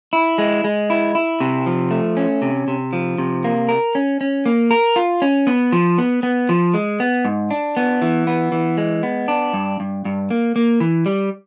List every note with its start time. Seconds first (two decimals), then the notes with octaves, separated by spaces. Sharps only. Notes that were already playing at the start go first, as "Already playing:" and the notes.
0.13 E4
0.38 G#3
0.64 G#3
0.90 E4
1.15 E4
1.40 C3
1.66 F3
1.91 A3
2.17 C#4
2.42 C3
2.68 C3
2.93 F3
3.18 C3
3.44 A#3
3.69 A#4
3.95 C#4
4.21 C#4
4.46 A#3
4.71 A#4
4.96 F4
5.22 C#4
5.47 B3
5.72 F3
5.98 B3
6.23 B3
6.49 F3
6.74 G#3
7.00 B3
7.25 G#2
7.51 D4
7.77 B3
8.02 E3
8.27 B3
8.52 E3
8.77 G#3
9.03 B3
9.28 D4
9.53 G2
9.80 G2
10.05 G2
10.30 A#3
10.56 A#3
10.80 E3
11.06 G3